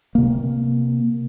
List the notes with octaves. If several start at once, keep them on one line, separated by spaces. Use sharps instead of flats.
C3 A#3